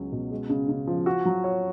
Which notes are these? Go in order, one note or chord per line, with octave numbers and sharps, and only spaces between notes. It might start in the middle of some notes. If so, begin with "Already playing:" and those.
Already playing: C#2 F#3 C#4
B2
G#3
C#3
C#3
F3
F#4
F#3
C#5